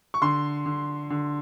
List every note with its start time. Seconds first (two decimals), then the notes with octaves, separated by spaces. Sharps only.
0.14 C#6
0.22 D3 C6
0.66 D3
1.10 D3